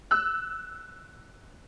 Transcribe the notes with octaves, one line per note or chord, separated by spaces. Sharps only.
E6 F#6